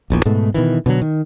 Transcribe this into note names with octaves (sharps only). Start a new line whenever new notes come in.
D#1 A#1 E2
G#2 B2 G#3 A3
B2 D#3 E3
B2 D3 E3 F#3
D#3